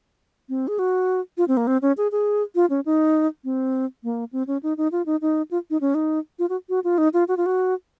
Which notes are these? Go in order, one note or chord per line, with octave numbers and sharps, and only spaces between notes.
C4
G#4
F#4
F4
C4
A#3
C4
C#4
G#4
G#4
F4
C#4
D#4
C4
A#3
C4
C#4
D#4
D#4
F4
D#4
D#4
F4
D#4
C#4
D#4
F4
F#4
F#4
F4
D#4
F4
F#4
F4
F#4